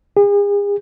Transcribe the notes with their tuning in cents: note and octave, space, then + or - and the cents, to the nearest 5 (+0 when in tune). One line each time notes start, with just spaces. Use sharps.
G#4 -40